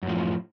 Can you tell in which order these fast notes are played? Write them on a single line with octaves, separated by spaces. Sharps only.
F#2 A2 F3